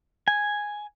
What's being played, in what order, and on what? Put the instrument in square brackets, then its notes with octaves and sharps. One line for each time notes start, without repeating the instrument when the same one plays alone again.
[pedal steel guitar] G#5